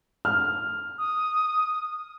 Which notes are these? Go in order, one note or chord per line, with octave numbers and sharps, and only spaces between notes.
F6
D#6